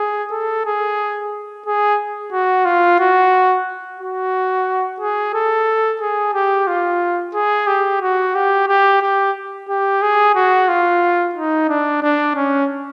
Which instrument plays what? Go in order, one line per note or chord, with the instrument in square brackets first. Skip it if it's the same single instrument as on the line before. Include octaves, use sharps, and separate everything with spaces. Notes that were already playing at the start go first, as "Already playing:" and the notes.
Already playing: [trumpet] G#4
A4
G#4
G#4
F#4
F4
F#4
F#4
G#4
A4
G#4
G4
F4
G#4
G4
F#4
G4
G4
G4
G4
G#4
F#4
F4
D#4
D4
D4
C#4